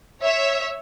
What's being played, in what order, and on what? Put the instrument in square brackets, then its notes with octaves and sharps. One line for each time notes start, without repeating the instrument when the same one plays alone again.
[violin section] C#5 E5